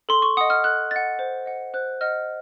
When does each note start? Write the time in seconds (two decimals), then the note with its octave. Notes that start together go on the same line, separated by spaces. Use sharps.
0.09 A4 C6
0.22 C#6
0.37 D#5 F#5 D#6
0.50 F6
0.64 A4 F#6
0.91 D#5 F#5 A6
1.19 C5
1.46 D#5 F#5
1.74 C5 F#6
2.01 D#5 F#5 F6